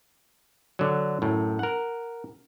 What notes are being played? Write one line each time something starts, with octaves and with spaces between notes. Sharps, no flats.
D3 F#3
F#2 A2
A#4 F#5